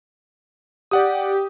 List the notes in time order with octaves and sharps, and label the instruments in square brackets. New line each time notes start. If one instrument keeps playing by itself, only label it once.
[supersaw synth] G4 [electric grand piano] D5 F#5 D#6